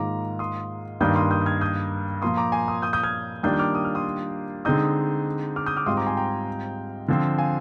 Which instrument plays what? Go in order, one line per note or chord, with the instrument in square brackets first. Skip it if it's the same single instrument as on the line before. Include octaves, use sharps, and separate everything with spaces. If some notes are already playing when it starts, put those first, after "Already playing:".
Already playing: [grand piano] G#2 D#3 A#3 F4 [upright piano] A#5 D6
[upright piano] C6 D#6
[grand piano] G2 D#3 A#3 D4 [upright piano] D#6 G6
[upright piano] C6 D#6
D#6 G6
G6
F6 G#6
D#6 G6
[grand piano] A#2 F3 A#3 [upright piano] C6 D#6
[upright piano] A#5 D6
G#5 C6
C6 D#6
D#6 G6
D#6 G6
F6 G#6
[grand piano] D#3 G3 A#3 D4 F4 [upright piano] D#6 G6
[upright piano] G6
D6 F6
D#6
F6
C6 D#6
[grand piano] D3 G#3 C4 D#4 [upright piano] D#6 G6
[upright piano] D6 F6
D#6 G6
D6 F6
[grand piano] G#2 G3 C4 F4 [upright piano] C6 D#6
[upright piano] A#5 D6
G#5 C6
G5 A#5
[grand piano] D3 F3 C4
[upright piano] F5 G#5